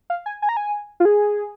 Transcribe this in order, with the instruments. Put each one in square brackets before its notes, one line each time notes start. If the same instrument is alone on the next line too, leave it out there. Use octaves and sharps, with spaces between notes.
[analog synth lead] F5
G#5
G#5
A#5
G#5
F4
G#4